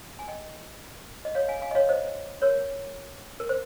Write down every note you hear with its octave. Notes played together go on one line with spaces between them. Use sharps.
G#5
D#5 G5
D#5
C#5 F5
F5 G#5
F5 G#5
D#5
C#5 F5
C5 D#5
A#4 C#5
A#4
C5